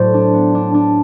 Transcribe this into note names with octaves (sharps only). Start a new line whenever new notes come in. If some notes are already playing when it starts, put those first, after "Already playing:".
Already playing: A2 F#3 C5 D5
D4
B3
D4
D4